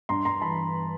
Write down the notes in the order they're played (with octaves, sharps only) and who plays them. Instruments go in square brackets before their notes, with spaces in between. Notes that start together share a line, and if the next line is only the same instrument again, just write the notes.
[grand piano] G2 A#5 C6
G2 A#5 C6
E3 A5 B5